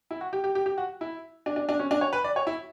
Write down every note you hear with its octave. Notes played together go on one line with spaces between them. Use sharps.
E4
F#4
G4
G4
G4
G4
F#4
E4
D4
D4
D4
C#4
D4
C#5
B4
D5
C#5
E4